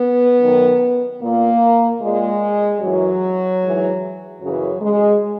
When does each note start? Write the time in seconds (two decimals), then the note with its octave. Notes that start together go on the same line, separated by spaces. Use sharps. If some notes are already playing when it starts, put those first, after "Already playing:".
Already playing: B3
0.41 F#2 D#3
1.21 A#2 A#3
2.02 A#2 G#3
2.81 F#2 E3 F#3
3.62 G#2 E3
4.42 F#2 C#3 E3 F#3
4.82 G#3